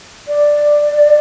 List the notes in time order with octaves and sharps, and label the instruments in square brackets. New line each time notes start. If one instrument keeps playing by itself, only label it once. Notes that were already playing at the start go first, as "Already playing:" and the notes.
[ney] D5